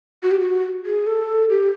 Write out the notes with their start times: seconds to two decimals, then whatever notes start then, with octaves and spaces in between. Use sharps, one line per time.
0.23 F#4
0.31 G4
0.40 F#4
0.86 G#4
1.07 A4
1.50 G4